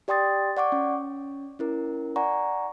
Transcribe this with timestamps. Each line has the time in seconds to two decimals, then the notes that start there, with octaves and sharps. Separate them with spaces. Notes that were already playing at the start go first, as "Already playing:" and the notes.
0.08 G4 D5 G5 C6 D#6 A6
0.57 D5 F#5 C#6 D6
0.72 C#4
1.59 C#4 E4 A#4
2.16 D5 F#5 G#5 A#5 C#6